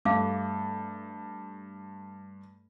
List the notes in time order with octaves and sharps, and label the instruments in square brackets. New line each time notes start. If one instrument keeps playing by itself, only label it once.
[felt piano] G2 [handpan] A3 [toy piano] F5 D6